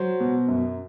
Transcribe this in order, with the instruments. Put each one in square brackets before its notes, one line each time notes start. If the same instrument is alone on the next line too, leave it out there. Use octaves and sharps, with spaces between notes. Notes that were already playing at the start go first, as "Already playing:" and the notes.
Already playing: [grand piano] F#3 C5
B2
F#2